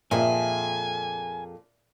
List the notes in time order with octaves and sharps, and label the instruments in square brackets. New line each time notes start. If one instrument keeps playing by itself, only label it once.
[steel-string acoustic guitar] F2 G#4 A4 [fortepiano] A#2 [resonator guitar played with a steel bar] E5 [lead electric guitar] G#5